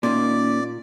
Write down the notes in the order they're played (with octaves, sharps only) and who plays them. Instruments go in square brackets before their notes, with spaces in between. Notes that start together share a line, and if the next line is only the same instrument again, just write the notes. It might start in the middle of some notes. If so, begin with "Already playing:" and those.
[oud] D#2 A#3 D#5 [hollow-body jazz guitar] A#2 [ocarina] C#4 [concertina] D5